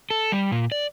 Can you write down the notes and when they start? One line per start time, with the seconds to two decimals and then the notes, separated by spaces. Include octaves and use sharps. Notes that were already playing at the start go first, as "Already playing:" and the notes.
0.11 A4
0.32 G3
0.52 A#2
0.72 D5